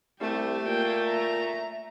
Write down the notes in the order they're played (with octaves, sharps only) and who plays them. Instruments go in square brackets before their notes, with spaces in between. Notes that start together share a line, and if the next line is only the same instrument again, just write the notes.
[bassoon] C2 [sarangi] A3 [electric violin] G4
[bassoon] A#2 [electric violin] A#3 G5
[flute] E5 [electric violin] A#5